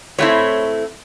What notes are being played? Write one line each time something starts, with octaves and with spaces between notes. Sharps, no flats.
A2 F#3 A3 C4 E4 C#5